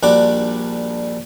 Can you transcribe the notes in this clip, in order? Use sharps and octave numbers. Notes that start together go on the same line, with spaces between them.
A#1 G3 D4 F#4 D6